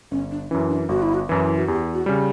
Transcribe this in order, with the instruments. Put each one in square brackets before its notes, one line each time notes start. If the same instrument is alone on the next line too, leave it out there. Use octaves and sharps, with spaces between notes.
[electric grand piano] G1 [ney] C#4
[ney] D4
[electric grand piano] F#2 E3 [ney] C#4
[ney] D4
[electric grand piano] G1 [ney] F#4
[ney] E4
F#4
[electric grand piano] F#2 E3 [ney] E4
[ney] F#4
[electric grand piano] E2 [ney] G4
[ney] F#4
[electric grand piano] C#3 G3